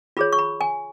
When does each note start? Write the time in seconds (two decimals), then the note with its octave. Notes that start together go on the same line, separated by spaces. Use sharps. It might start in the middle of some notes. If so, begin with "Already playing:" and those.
0.17 F4 G#4 C#5 B5
0.33 C#6
0.38 B5
0.61 G#5